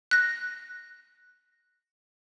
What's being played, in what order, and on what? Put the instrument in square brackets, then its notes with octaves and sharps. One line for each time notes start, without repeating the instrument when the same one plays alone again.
[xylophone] F#6 A#6